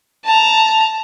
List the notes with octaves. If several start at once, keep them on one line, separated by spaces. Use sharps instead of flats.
A5 A#5